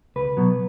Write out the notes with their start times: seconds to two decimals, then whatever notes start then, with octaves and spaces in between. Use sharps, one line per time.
0.16 C#2 B4
0.37 B2 F#3